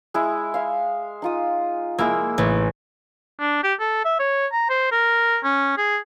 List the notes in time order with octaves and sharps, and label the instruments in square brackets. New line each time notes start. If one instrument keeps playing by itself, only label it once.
[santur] G#3 E4
E5 F5
D#4 F4 D#6
[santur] G#3 E4 E6 [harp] A#3
[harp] A1
[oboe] D4
G4
A4
E5
C#5
A#5
C5
A#4
C#4
G#4